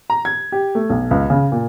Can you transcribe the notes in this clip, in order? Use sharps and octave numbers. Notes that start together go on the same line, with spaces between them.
A#5
G#6
G4
A3
B1
C#2
C#3
A#2